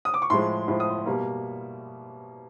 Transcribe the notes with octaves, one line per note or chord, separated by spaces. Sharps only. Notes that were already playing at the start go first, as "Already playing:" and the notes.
D#6
D6
C#6
A2 F3 G#3 C6
A2 F3 G#3
D#6
B2 G3 A#3